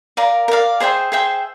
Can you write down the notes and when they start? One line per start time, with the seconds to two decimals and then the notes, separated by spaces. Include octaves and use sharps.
0.17 A#4 D5 F5
0.48 A#4 D5 F5
0.80 G#4 C5 E5 G5
1.12 G#4 C5 E5 G5